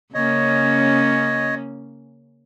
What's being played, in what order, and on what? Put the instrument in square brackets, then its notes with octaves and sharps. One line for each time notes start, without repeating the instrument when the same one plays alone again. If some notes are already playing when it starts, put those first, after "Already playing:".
[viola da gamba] C#3 A#3 C#4 [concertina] C#5 D#5